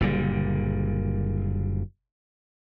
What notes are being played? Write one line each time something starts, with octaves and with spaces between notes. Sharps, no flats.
F#1 A#2 D3 G3